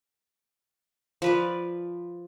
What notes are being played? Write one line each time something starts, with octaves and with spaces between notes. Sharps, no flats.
F3 B4 D5